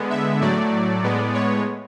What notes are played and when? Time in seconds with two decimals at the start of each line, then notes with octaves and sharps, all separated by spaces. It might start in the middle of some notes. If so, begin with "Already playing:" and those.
Already playing: D3 G#3 B3
0.10 E5
0.41 A2 F#3 A3 D5
1.03 A2 G#3 B3
1.34 C#5